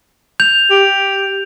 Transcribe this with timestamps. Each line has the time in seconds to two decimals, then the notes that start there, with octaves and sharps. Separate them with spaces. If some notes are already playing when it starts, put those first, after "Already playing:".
0.40 G6 F7
0.70 G4